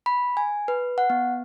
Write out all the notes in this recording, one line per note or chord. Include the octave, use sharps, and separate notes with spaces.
B5
G#5
B4
F#5
B3